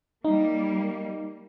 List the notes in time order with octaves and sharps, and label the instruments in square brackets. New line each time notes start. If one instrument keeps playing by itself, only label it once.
[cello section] G3 A#3 [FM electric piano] D#4